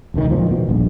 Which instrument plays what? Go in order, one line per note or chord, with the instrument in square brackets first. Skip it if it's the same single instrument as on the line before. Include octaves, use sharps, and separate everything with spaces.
[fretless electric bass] E1 C#2 A#2 D#3
A#2 F3
B2
D#1 A#1